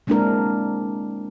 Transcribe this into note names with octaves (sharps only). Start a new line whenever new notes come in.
G#3 A#3 C4 D4 E4 A#4